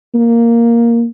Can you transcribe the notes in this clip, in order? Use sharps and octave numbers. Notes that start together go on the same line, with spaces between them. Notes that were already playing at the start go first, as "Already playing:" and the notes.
A#3